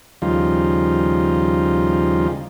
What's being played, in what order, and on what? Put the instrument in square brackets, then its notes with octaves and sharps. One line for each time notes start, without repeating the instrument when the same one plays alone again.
[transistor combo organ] D#2 C#3 F3 G3 D#4 F4